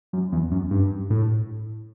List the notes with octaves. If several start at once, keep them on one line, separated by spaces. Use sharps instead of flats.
F#2
E2
F#2
G2
A2